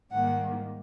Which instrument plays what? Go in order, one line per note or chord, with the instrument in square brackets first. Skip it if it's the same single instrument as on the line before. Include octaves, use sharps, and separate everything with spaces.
[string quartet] G#2 D#3 G3 A#3 F#5